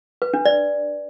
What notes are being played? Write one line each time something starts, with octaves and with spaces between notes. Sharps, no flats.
B4
D4
D5